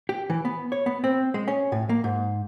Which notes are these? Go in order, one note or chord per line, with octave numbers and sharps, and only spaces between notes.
G4
E3
B3
C#5
B3
C4
G#3
C#4
A2
A#3
G#2